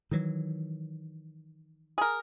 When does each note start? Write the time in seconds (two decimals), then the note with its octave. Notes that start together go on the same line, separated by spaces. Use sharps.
0.12 D#3 E3 F#3
1.98 G#4 A#4